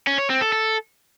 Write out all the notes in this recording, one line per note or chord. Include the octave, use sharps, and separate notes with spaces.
C#4
C#5
C4
A4
A4